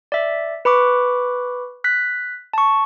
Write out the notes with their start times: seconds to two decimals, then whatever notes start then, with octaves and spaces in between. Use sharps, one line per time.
0.12 D5 E5
0.65 B4 B5 C#6 D6
1.84 F#6 B6
2.53 A5 C#6